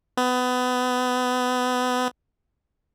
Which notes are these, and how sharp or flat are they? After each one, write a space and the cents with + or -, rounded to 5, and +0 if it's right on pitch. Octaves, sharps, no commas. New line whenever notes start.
B3 +25